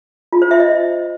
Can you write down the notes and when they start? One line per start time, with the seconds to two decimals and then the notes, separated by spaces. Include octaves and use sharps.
0.33 F4
0.42 C5
0.51 E5
0.60 D#5